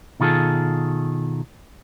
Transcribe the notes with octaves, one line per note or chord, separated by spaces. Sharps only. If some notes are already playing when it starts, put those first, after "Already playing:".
B2 D#3 F4 G#4 A4